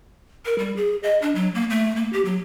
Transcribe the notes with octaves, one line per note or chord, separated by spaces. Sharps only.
A#4
G3
G#4
D#5
D4
F#3
A#3
A3
A#3
G4
F#3